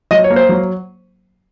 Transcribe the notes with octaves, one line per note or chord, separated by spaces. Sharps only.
F#3 D#5
C#5
A#3
C5
F#3